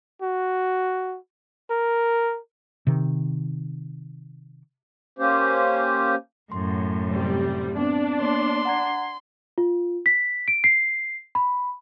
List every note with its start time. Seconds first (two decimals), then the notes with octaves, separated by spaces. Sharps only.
0.22 F#4
1.70 A#4
2.87 C3 D#3
5.19 A#3 C#4 G4 C5
6.52 F#2 A2 C6
7.08 C3 G3
7.77 B3 C4 D4
8.20 A#3 B3 C#5 C6
8.65 F#5 A#5 G#6
9.58 F4
10.06 B6
10.48 D7
10.64 C7
11.35 B5